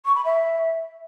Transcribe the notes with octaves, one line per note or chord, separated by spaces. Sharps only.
C#6
B5
E5